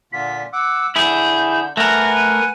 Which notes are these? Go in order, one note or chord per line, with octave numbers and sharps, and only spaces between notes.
A#2 D3 F4 B6
F#5 D6 E6
D3 E4 G#4 G6
A3 A#4 B4 F#5 G#5 A#6
D#7